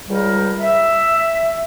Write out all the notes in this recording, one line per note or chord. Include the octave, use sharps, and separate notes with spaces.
C#2 G3 A#4
E5